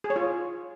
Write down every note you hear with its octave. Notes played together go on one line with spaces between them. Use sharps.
G#4
C#5
F4